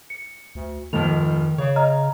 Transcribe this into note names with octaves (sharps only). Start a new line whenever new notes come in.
C#7
D2
F1 G#2 D#3 F3 F7
C#3 C#5
D#5 A#5 F6